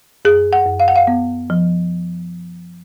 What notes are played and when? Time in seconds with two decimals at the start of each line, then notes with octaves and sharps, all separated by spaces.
0.25 F#2 G#4
0.53 F#5
0.66 F#2
0.80 F5
0.88 F#5
0.96 F5
1.07 B3
1.50 F3